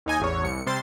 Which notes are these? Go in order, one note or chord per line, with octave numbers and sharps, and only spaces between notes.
D#2 D#4 G#5
A1 E2 C#5
C2 C#7
C3 G3 C5 C6 A6